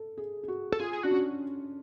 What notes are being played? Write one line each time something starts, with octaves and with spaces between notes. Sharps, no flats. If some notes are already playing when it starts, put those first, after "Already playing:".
Already playing: A4
G#4
G#4
F#4
A4
F4 G#4
G#4
D4 F#4
C#4